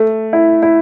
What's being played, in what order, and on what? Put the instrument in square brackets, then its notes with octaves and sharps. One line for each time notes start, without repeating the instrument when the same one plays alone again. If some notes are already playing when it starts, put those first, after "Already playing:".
Already playing: [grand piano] A3
E4
E4